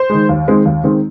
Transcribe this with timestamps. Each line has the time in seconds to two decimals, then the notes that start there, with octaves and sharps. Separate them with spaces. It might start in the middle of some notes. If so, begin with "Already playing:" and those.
Already playing: C5
0.10 D#3 G#3
0.29 D#2
0.48 D#3 G#3 C4
0.66 D#2
0.84 D#3 G#3 C4